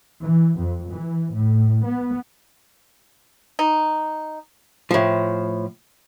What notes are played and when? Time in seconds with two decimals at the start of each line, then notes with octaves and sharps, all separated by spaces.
0.22 E3
0.59 F2
0.90 E3
1.33 A2
1.85 B3
3.59 D#4
4.91 A2 F3